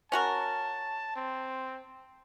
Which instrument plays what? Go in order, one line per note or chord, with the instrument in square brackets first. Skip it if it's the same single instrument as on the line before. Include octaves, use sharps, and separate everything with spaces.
[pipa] C#4 F#4 A#4 [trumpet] A5
[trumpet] C4